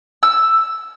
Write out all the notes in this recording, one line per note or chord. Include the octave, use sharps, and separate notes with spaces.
E6